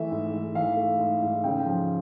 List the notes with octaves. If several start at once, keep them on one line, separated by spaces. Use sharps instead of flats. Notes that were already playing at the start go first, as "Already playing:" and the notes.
Already playing: E3 A3 E5
G#2
G#2
E3 F5
A3
G#2
G#2
C#3 G5
F3